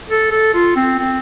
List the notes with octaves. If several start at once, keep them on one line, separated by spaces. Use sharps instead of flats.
A4
A4
F4
C4
C4